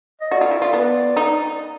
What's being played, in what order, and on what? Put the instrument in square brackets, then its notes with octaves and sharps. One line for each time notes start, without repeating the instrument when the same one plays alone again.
[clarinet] D#5
[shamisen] F#4 [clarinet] D5
[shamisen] F4
E4
F4
B3
D#4